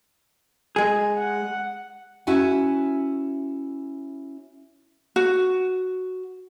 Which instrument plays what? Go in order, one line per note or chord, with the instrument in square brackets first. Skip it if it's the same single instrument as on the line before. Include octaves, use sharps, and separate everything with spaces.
[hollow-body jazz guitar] G#3 G#4
[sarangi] F#5
[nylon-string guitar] C#4 E4 F#4 G#5
[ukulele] F#4